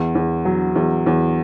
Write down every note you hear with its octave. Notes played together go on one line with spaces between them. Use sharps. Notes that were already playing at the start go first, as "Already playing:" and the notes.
Already playing: E2
E2
F#3
E2
E2